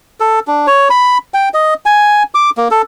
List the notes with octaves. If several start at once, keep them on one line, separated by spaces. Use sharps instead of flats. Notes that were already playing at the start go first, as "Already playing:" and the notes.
A4
D4
C#5
B5
G5
D#5
G#5
D6
A#3
A4